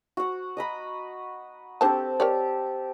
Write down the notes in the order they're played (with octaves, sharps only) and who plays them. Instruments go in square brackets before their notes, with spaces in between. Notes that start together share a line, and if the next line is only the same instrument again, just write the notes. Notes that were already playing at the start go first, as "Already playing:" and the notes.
[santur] F#4 F#5
D#5 A#5 B5
[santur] C4 G4 A4 [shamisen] D4 C5 A5
[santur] G4 [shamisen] A#4 C#5 D5